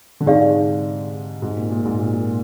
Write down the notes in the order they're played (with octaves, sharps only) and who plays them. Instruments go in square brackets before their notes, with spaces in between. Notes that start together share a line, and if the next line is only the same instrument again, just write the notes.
[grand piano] D3
[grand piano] G#2 C3 [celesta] D#4 G#4 D5 F5
[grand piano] G#2 C3
A#2
A#2
G#2
A#2
A#2